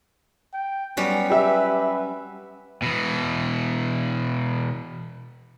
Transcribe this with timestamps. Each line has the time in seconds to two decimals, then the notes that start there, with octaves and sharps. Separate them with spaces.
0.54 G5
0.97 F#3 G3 B3 C#4
1.30 G4 B4 E5
2.82 B2 E3